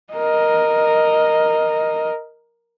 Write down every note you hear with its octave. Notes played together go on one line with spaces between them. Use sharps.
A#4 D#5